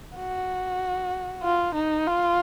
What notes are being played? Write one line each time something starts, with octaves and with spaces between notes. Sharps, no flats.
F#4
F4
D#4
F4